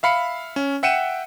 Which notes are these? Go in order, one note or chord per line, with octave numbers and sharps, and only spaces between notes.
E5 F5 B5 C#7
C#4
E5 F#5 G5 C#7 D#7 E7